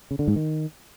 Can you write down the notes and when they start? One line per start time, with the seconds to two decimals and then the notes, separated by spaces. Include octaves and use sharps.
0.11 C#3
0.19 D3
0.28 G#2
0.36 D#3